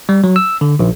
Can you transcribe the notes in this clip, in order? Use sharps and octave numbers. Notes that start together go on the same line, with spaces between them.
G3
F#3
E6
D3
A#1